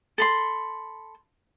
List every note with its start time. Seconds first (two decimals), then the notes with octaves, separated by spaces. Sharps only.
0.18 A4 B5 C6